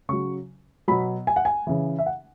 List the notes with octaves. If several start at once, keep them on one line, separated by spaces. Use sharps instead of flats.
C#3 F#3 C#6
B2 F#3 B5
G#5
F#5
G#5
C#3 E3
E5
F#5